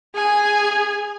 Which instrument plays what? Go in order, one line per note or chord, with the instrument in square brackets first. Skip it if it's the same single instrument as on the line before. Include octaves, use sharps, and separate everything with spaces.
[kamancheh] G#4 G#5